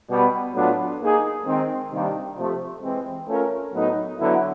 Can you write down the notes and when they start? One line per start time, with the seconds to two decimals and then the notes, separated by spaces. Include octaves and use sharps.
0.09 B2 G3 B3
0.54 A2 F#3 B3 D4 F4
1.01 A#3 D#4 G#4
1.46 D#3 G#3 C4
1.91 C3 D#3 G3 A#3 D4
2.37 C3 F3 A3
2.82 E3 G#3 C4
3.28 A3 C#4 F4 A#4
3.73 A2 F#3 B3 D#4
4.18 D3 F#3 B3 E4